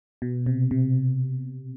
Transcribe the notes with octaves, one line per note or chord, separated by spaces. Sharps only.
B2
C3
C3